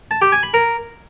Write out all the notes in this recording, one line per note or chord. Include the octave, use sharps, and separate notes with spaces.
A5
G4
G#5
B5
A#4